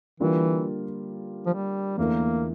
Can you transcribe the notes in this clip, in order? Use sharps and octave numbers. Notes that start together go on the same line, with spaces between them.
D3 E3 G3 A#3 F4
F3
G3
E2 D3 A3 A#3 E4 A#4